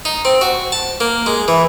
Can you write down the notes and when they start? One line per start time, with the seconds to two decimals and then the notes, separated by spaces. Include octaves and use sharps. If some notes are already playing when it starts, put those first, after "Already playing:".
0.05 D#4
0.25 C4
0.41 F#4
0.72 A5
1.00 A#3
1.26 G#3
1.48 E3